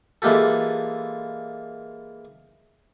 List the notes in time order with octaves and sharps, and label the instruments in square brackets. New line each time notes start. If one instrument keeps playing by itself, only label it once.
[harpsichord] E3 G#3 A#3 F4 G4 A4